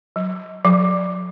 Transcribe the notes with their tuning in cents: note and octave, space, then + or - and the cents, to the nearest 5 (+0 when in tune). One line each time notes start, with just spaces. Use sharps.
F#3 +0
F#3 -35